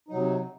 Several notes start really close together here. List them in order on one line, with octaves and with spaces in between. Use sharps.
D#4 F#3 C3